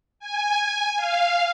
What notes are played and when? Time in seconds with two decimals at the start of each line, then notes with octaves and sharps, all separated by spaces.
0.20 G#5
0.97 F5